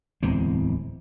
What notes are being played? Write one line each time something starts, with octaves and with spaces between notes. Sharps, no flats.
D1 E2 G#3 C4